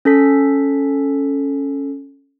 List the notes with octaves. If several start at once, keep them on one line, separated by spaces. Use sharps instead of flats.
C#4 A4 B6